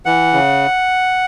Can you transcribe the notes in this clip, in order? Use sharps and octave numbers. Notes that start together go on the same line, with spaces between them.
E3 F#5
C#3